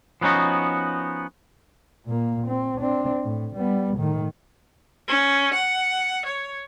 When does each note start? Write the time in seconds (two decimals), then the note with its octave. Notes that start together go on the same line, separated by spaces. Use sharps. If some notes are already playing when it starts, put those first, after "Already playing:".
0.21 F3 B3 C#4 D#4 F#4
2.06 A#2 A#3
2.47 C4
2.80 C4 D4
3.24 A2
3.55 G3 B3
3.97 A2 D#3
5.08 C#4
5.54 F#5
6.26 C#5